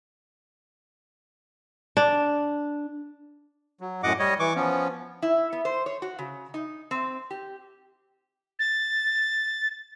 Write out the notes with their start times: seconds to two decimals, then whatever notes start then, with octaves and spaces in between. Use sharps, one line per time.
1.97 D4
3.80 F#3
4.03 F#2 A2 D#5 F#5 D6
4.19 G3 C#5 D#5
4.39 E3 C#6 D6
4.56 F3 B3 C#4
5.22 E4
5.53 B3
5.65 C5
5.86 C#5
6.02 F#4
6.19 C#3
6.54 D#4
6.91 C4
7.31 G4
8.59 A6